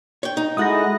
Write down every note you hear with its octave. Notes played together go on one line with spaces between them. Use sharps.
C#5 G5
D#4
G#3 E4 F#4 A4 D#6 F#6 A#6